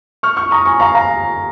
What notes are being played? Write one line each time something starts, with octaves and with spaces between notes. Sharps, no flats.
C#6 F6
C#6 F6
A#5 D#6
G#5 C#6
F5 A#5
F5 A#5